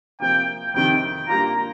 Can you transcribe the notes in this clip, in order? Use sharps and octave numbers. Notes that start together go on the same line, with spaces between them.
C3 F3 A#3 G5
F2 C3 D#3 G5
G2 G3 A#3 F4 A#5